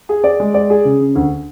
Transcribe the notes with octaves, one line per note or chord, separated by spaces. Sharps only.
G#4
D5
G#3
D5
G#4
C#3
C#3
D2